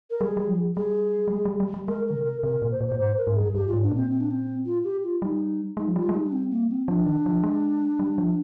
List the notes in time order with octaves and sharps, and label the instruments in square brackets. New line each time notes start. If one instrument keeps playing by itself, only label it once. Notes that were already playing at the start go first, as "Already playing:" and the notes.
[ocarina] A#4
[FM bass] G3 [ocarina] G#4
[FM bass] G3
F3
[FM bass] G3 [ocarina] G#4
[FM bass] G3
G#3
G3
G3
G3
[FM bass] G#3 [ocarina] A#4
[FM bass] D3 [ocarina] A#4
[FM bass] C3
[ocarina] A#4
[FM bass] C3 [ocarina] A#4
[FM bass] A#2
[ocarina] C5
[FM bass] A#2
[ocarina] C5
[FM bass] A#2
[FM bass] G#2 [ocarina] C5
[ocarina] A#4
[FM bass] G#2
[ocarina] G#4
[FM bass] G2
[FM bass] G2 [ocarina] G4
[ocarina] F4
[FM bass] G#2
[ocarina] D4
[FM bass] A#2 [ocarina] C4
[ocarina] C4
D4
C4
F4
G4
F4
[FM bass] G3 [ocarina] D#4 F4
[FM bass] G#3 [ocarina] D#4
[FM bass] F3
[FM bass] G3 [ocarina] F4
[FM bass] G#3
[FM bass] G3 [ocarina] D#4
[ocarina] D4
C4
A#3
C4
[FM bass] F3 [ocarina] D4
[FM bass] D#3
F3
G#3
G3
F3